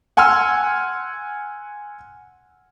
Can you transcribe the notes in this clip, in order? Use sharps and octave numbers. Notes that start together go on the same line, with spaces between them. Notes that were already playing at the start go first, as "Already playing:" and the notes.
F#5 G#5 C6 E6 F6